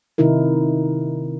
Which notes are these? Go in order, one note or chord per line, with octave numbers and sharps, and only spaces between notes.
C3 D#3 D#4 E4 A#4